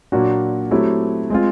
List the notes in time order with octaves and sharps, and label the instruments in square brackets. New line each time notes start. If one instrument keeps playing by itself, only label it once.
[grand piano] A#2 F#3 A#3 D4 F#4
F#3 A3 C4 E4 G4
G#3 C4 F4